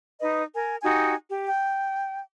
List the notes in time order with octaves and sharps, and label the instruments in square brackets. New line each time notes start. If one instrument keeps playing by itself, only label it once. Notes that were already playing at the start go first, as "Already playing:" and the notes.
[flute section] D#4 B4 D#5
A#4 G#5
D#4 F#4 G4 G#5
G4
G5